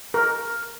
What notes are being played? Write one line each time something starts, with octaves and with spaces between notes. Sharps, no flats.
A#4